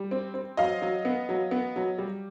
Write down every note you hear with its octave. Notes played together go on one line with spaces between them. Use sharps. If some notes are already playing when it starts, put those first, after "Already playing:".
Already playing: G3
C4
C4
F#3 D#5 F5
F#3
B3
F#3
B3
F#3
G3